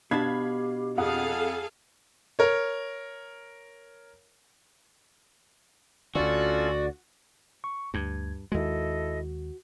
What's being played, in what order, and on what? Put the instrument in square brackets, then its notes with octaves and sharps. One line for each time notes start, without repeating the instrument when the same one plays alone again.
[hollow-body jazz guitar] B2 D4 A5 [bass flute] G4 [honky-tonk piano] F5 B5 G#6
[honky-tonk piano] F2 F#5 D#6 [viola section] G#4 A4 F5
[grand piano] A#4 C#5
[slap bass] D2 D3 [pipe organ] C#4 F4 A4 [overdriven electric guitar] F#4 [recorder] D5
[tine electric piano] C#6
[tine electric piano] D2 G#6 [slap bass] G2
[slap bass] D#2 G#3 [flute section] E4 A4 D#5 [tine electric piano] F#4